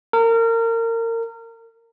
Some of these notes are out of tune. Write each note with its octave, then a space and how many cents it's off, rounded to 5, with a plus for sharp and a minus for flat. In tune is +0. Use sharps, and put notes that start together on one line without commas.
A#4 -30